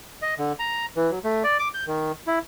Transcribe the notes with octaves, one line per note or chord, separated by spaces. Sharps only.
D#5
D3
A#5
E3
F#3
A3
D5
D6
G6
D#3
E4